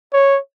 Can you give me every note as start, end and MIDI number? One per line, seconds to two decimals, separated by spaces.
0.13 0.39 73